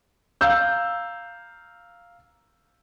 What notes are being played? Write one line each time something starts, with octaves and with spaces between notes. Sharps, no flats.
F5 A#5 E6 G6